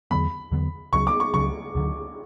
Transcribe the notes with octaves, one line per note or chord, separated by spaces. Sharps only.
E2 D3 F#3 B3 B5
E2 D3 F#3 B3
C#2 C#3 F#3 C#6
D6
C#6
C#2 C#3 F#3 C#6
D2 D3 F#3